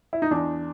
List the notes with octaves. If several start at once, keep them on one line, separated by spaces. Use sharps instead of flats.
E4
D#4
E2 D4